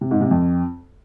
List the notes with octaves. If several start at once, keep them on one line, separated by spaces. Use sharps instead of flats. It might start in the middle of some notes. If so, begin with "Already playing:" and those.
C3
G#2
C3
F2